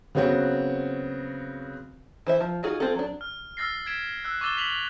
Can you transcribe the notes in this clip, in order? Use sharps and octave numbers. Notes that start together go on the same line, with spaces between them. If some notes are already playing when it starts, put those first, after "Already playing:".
C#3 F#3 B3 C4 F#4
E3 C5 E5
F3
D#4 F4 F#4 G#4
C4 F4 G#4 A4
F#3 D4
F6
E6 F6 A6 A#6 C7
G#6 B6 D7 E7
E6 F#6
C#6 D6 E6 A6 E7 G7
B6 F7 F#7